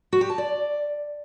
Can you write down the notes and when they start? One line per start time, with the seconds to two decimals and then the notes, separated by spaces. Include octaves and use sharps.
0.13 F#4
0.21 G4
0.30 A5
0.38 D5